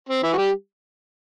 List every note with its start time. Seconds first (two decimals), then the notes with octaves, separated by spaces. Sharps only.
0.09 C4
0.23 E3 E4
0.33 F#4
0.37 G3 G4